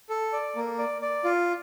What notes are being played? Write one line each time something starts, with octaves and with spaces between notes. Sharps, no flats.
A4
D5
A#3
D5
D5
F4